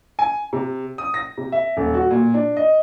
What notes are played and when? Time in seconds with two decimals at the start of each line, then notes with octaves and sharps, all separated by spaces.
0.19 G#5
0.53 C3
0.98 D#6
1.14 A#6
1.38 C3
1.52 E5
1.77 D#1
1.94 F#4
2.10 A#2
2.34 D4
2.57 D#5